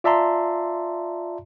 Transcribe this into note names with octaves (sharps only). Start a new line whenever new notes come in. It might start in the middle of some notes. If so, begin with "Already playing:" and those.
F4 D5 E5 A5 A#5 C6